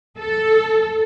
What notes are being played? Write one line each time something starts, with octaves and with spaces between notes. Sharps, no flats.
A4